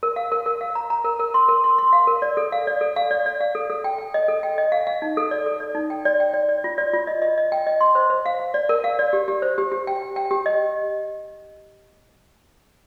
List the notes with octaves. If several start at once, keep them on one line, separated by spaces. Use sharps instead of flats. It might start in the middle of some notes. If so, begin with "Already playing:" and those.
A#4
F5
A#4
A#4
F5
A#5
A#5
A#4
A#4
C6
A#4
C6
C6
F5
A#4
D5
A4
F5
D5
A4
F5
D5
D5
F5
A4
A4
G5
G5
D#5
A4
G5
D#5
F5
F5
D#4
A4
D5
A4
D5
D#4
G5
D5
G5
D5
D5
F4
D5
F4
D#5
D#5
D#5
G5
D#5
C6
C5
C5
F5
F5
D5
A#4
F5
D5
G4
G4
C5
G4
G4
G5
G5
G5
G4
D#5